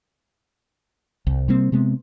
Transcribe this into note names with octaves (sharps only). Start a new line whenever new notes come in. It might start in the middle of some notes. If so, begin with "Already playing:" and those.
C2
C3 G3 A#3 C4
C3 G#3 B3 C4